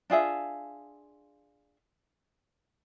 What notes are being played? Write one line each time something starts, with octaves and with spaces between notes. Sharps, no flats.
D4 F4 G#4 E5